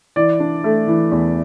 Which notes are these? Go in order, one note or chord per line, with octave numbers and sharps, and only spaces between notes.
E3 D5
D4
A3
E3
E2